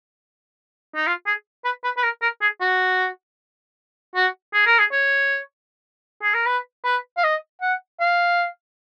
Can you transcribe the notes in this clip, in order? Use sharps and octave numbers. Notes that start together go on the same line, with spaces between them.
D#4
F4
G#4
B4
B4
B4
A#4
A#4
G#4
F#4
F#4
G#4
A#4
G#4
C#5
G#4
A#4
B4
B4
F5
D#5
F#5
F5